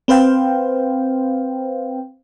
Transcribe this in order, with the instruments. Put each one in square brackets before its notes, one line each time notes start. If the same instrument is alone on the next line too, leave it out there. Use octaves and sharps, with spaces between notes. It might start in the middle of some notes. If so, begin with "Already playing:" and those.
[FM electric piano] C4 B4 C5 F5 G5